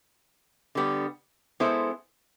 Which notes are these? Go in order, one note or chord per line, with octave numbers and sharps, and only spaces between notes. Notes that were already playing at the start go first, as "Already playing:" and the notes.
D3 G3 B3
G#3 B3 E4 A4 C5